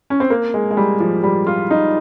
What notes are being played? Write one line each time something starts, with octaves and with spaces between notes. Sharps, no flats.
C#4
C4
A#3
G#3
G#3
G3
F3
G3
F4
D#4